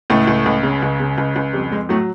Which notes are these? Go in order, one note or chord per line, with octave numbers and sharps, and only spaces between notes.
C#2 A2 A3
C#2
C#2
C#3
C#2
C#3
C#2
C#2
F2 G3
F2 G#3
A2 F#3 A3